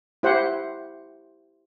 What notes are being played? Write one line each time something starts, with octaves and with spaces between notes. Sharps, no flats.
E4 G4 C5 F#5